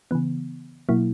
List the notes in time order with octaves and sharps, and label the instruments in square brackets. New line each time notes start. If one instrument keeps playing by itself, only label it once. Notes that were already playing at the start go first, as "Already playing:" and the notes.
[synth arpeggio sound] C#3 E3 B3
B2 F#3 A#3 E4